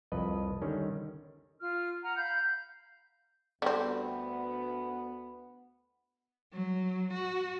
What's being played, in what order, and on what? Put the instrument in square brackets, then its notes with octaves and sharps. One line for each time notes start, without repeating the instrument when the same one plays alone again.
[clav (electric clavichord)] C2 F2 B4 D#5
D3 D#3 G3 C#4
[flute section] F4 F6
F#5 A#5 F6
F5 B5 G6
[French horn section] D2 B3 [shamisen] D3 G3 C4
[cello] F#3
F#4